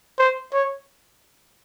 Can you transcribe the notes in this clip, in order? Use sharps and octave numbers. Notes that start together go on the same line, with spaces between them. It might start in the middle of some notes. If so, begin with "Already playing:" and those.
C5
C#5